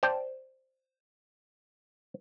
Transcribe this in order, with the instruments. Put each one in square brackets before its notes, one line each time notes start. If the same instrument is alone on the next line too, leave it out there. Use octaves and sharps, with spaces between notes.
[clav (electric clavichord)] C5 D5 G5 A5